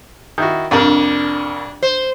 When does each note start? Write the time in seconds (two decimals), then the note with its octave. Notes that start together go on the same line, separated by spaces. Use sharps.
0.38 D#3 E4 F#4
0.71 C2 F2 D4 A#4
1.83 C5